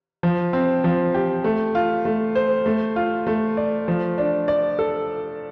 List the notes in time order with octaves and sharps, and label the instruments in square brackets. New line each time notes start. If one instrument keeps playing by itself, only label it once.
[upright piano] F3
C4
F3
G4
A3
F4
A3
C5
A3
F4
A3
D5
F3
D4
D5
A4